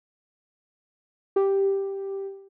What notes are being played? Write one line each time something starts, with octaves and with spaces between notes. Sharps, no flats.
G4